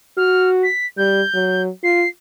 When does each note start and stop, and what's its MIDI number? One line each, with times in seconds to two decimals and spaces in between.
0.17 0.67 66
0.17 0.49 89
0.63 0.86 95
0.97 1.22 55
0.97 1.63 91
1.34 1.69 54
1.84 2.05 65
1.84 2.09 96